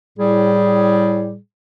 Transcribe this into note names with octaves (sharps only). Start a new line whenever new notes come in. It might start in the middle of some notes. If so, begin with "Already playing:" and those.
A2 G3 G#4